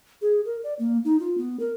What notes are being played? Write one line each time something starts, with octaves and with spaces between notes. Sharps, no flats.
G#4
A#4
D5
A#3
D#4
F4
B3
A#4